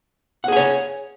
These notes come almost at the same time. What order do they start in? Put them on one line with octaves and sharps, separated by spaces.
F#5 G#4 G#5 C#5